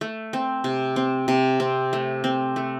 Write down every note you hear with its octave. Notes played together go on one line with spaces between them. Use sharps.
A3
C4
C3
C4
C3
C4
A3
C4
A3